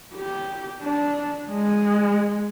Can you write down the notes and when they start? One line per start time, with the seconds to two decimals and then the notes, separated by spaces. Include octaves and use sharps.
0.15 G4
0.83 D4
1.50 G#3